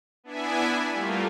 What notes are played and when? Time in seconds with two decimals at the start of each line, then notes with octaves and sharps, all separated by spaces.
0.24 B3 D4 E4 E5 G#5
0.91 G3 A3 A#3 F4